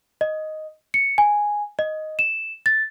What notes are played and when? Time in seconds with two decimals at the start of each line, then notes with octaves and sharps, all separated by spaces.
0.21 D#5
0.94 C#7
1.18 G#5
1.79 D#5
2.19 E7
2.66 A6